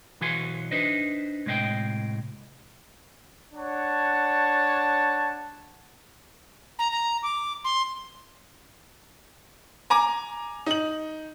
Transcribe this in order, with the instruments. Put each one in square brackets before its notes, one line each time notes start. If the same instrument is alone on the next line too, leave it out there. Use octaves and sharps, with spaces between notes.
[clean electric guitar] B1 E3 F#4 F5 G#5 C6
D4 D#4 B4 C5 D#5 E5
A2 C3 G#3 D#5 F5 G5
[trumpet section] D4 C#5 F#5 A5
[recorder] A#5
A#5
D6
C6
[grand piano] G#5 A#5 D6
D#4 F#7